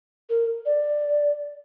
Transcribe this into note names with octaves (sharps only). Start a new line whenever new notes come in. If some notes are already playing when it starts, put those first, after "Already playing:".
A#4
D5